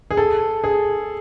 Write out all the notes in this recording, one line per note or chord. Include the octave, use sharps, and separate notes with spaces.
G#4
A4
G#4